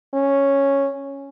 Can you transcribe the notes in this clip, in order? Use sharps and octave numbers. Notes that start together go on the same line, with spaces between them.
C#4